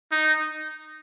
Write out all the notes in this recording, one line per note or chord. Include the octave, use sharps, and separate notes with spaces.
D#4